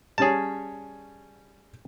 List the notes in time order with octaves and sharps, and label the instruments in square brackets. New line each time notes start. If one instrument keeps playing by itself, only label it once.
[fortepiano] G3 C#4 C#5 [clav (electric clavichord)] G#4 A5